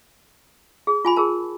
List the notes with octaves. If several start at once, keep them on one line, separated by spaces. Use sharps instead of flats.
G#4
F4 G#5 B5
G#4 A#4 A5